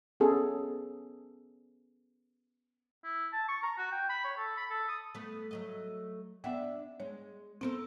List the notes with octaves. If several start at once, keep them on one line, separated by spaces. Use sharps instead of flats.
B3 C#4 G#4 A4
E4
A5
C#6
A#5
F#4
G5
B5
C#5
A4
B5
A4
D#6
A3 B3
F#3 A3 D#5
B3 D4 D5 E5 F#5 G5
G#3 C#5
B3 C4 A4 A#4 C5